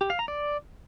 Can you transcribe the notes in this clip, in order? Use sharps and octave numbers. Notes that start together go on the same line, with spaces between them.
G4
F5
A#5
D5